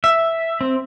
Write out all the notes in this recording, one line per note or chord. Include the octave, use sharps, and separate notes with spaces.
E5
C4